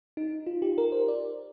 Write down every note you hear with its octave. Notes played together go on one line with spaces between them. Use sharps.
D#4
F4
G4
A#4
C5
D5